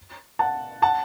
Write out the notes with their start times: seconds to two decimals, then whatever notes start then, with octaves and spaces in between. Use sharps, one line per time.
0.39 F#5 A5
0.82 F#5 A5